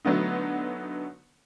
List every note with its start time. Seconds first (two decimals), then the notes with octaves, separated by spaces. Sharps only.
0.05 D3 F#3 A3 B3 D#4